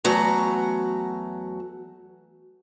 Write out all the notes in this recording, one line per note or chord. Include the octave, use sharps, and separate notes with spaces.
E2 F#3 A3 F#4 A#5